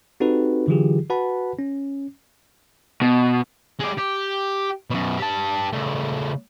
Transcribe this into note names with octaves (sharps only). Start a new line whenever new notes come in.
C4 D#4 F#4 G4 A4 B4
D3 E3 F#3 F4 G4 G#4
F#4 B4 F#5 A5 B5
C#4
B2
G#3 G4
G4
F#2 B2
G4 A5
C#3 A3